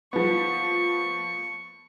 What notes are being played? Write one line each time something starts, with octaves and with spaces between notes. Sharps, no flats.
F3 B3 C#6